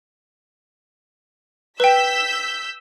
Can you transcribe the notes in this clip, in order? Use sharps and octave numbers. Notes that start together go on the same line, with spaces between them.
B4 G5 E6 G6 B6